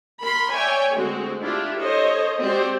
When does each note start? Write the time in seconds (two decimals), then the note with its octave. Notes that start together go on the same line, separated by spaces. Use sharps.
0.22 A#4 B5 C6
0.52 C#5 D5 E5 G5 G#5
0.95 D3 G#3 A3 C4 F#4
1.41 D4 E4 F4 G4
1.81 A4 C5 C#5 D#5
2.41 G#3 C4 F#4 G4 C5 D5